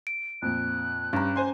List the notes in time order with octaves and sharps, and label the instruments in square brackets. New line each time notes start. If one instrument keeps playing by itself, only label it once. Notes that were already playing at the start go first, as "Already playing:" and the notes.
[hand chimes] D7
[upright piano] F2 A#2 [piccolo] F#6
[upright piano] G2 [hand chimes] C#4 A#5
[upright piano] C5 G#5 C6